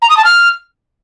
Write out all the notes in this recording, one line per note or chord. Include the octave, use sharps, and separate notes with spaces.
A#5
D#6
A5
F6